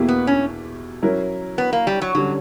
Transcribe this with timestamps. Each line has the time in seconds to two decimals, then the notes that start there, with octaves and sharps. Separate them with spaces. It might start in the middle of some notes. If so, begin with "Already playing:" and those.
Already playing: E2 B2 A#3 E4 G4
0.08 B3
0.27 C#4
1.02 F#3 C#4 E4 A#4
1.58 B3
1.73 A#3
1.87 G3
2.02 F#3
2.15 D3 F#3 G3 C#4